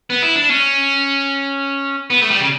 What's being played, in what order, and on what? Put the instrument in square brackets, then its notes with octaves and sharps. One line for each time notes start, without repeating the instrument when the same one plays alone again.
[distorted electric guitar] B3
E4
D4
C#4
B3
A3
G3
C#3